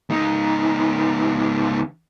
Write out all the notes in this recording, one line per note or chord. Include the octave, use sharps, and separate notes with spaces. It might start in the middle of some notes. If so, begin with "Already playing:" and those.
C#2 D#4